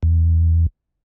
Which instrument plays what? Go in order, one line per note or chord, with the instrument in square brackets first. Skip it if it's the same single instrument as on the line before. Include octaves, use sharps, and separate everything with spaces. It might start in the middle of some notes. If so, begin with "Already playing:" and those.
[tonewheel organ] E2